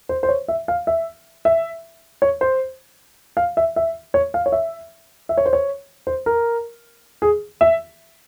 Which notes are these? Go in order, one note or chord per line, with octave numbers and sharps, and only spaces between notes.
C5
C5
C#5
E5
F5
E5
E5
C#5
C5
F5
E5
E5
C#5
F5
C#5
E5
E5
C#5
C5
C#5
C5
A#4
G#4
E5